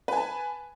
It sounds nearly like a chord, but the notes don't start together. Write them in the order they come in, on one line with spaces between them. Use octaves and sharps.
B4 G#5 A5